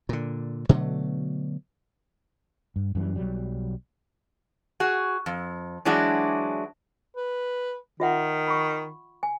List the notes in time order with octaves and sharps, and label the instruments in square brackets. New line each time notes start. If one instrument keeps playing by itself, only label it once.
[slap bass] A#2 D3
B2 D3 F#3 A3
[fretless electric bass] G2
F#2 E3 G3
B1 F#3 G3
[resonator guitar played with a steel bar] F#4 G#4
F2
E3 F#3 G#3 D4 E4 F#4
[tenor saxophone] B4
[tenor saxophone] D#3 [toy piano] F4 E5 F#5
[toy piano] B5 C#6
G#5